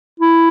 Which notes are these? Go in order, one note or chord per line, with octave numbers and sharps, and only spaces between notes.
E4